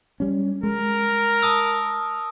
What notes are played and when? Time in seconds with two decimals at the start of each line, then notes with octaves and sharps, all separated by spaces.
0.20 G3 C#4
0.63 G#3 A#4
1.42 A5 D#6 E6